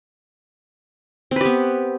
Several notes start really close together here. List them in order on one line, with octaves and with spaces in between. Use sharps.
C4 B4 G4 B3